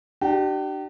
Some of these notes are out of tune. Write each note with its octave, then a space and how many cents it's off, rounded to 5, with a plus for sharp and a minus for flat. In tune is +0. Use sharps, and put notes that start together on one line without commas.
D4 +35 G4 -35